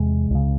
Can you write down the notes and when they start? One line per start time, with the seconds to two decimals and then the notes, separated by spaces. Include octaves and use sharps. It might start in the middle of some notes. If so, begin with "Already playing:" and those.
Already playing: E2 C3 G#3
0.30 C#2 C#3